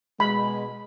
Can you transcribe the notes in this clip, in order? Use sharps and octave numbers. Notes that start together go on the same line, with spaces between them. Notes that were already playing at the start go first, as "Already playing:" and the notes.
B2 G#3 B5